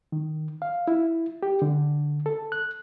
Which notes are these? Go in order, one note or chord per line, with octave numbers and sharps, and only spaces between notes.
D#3
F5
E4
G4
D3
A4
F#6